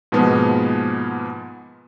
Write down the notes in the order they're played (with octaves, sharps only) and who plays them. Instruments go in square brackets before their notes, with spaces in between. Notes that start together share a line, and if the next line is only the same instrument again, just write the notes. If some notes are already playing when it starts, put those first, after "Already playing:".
[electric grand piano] G#2 B2 F3 G#3 A#3 B3